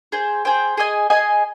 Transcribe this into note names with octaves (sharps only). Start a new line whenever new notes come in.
G#4 C5 G5
G#4 C5 G5
G#4 D#5 G#5
G#4 D#5 G#5